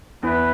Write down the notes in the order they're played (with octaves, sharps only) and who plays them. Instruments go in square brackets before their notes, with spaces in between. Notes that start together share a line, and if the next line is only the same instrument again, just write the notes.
[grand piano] E2 E3 [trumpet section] E4 B4